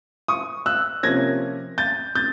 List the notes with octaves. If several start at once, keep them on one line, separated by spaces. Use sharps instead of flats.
C#6 D#6
E6 F#6
C3 F3 A#3 C#4 G#6 A#6
G6 A6
G6 A6